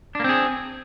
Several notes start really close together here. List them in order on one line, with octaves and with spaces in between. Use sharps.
D4 A#3 C4 G#4